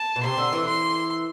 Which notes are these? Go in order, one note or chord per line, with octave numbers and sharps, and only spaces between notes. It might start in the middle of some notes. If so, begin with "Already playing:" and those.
Already playing: A5
B2
C3 C6
D3
E3
C6